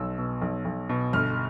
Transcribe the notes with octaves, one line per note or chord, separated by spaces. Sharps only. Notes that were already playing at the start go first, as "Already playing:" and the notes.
Already playing: B1 B2 E6
B2
B1
B1
B2
G1 F6